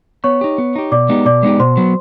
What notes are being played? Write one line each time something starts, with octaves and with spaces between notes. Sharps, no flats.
B3 C#5 C#6
D#4 G4
B3
D#4 G4
B2 D5 D6
G#3 B3 D#4 G4
B2 D5 D6
G#3 B3 D#4 G4
B2 C5 C6
F#3 B3